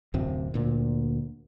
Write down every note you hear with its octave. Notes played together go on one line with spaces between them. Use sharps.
D1 F#2 C3 C4
D2 A#2